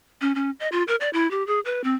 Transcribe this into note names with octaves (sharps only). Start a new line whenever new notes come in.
C#4
C#4
D#5
F4
A#4
D5
E4
G4
G#4
B4
C4